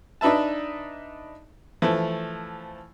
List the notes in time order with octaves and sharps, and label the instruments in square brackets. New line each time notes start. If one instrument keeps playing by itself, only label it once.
[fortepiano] D4 D#4 B4 E5 A5
E3 F3 A3